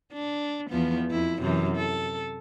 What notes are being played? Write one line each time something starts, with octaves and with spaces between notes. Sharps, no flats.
D4
E2 F3 B3
F2 E4
F#2 C3 E3
A4